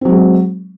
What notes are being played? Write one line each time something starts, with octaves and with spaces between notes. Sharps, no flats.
F#3 G#3 C4